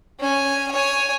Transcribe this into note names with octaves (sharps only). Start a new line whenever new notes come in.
C#4 G#5
C#5 G#5